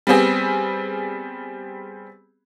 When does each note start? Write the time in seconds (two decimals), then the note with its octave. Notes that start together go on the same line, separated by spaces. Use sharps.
0.07 G3 B3 C4 G#4